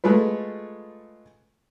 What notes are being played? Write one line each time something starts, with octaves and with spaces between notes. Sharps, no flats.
G#3 A3 F4 B4